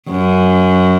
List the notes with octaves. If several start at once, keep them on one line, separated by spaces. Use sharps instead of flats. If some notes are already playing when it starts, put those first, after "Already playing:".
F#2